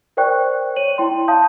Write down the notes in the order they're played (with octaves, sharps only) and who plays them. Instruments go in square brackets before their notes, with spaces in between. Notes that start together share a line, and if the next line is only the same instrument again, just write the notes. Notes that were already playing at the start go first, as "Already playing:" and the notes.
[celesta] A#4 C5 D5 G5 C#6 F#6
C#5 D#7 F#7
E4 G5 C6
F5 A5 D#6 G6